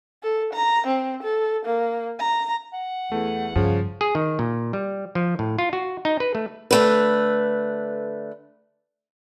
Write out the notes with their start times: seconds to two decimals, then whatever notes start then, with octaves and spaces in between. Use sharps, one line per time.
0.23 A4
0.53 A#5
0.87 C4
1.23 A4
1.66 A#3
2.19 A#5
2.73 F#5
3.12 E2 A3
3.56 G2 C#3 F3
4.01 G#4
4.15 D#3
4.39 A#2
4.73 G3
5.15 F3
5.39 A2
5.58 F4
5.73 F#4
6.05 D#4
6.20 B4
6.35 A3
6.71 D3 A3 B4